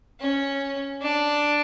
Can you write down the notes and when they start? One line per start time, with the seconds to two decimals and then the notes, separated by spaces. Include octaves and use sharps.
0.20 C#4
1.02 D4